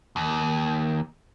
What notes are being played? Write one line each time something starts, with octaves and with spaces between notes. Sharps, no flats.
D#2